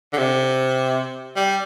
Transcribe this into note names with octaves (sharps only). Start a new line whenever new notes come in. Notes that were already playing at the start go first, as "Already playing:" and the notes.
D3
C3
G3